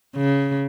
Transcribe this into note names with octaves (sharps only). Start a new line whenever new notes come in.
C#3